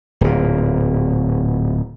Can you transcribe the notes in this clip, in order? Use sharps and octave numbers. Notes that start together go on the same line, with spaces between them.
D1 A#2